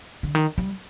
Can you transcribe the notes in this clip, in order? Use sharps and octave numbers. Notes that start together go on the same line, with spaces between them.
D3
D#3
G3